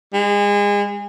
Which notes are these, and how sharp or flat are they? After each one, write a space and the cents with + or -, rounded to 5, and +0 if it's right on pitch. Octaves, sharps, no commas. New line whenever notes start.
G#3 -30